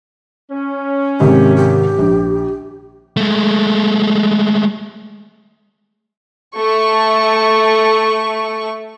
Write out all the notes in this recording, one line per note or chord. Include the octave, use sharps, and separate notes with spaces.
C#4
G#2 C3 D#3 G4
G4
A#1
G#3 A3
A3 C#6